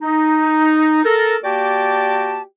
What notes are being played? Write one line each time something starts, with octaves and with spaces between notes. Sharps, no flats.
D#4
A4 A#4
A#3 F#4 G4 D5 G5 A5